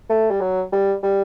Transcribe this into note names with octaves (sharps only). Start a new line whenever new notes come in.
A3
G3
F#3
G3
G3